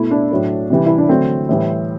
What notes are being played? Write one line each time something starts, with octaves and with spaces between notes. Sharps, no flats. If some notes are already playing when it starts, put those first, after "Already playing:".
Already playing: B2 A3 E4
D4
A2 F#3 A3
C3 E3 G3
E4
D4
D3 F#3 A3 C4
A2 E3 G3